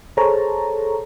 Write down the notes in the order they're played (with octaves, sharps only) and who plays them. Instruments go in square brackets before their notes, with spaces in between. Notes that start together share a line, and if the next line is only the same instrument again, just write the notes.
[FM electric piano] G#4 A4 C5 C#5 A5 A#5